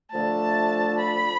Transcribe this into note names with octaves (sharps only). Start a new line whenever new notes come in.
D3 F3 A3 A5
B5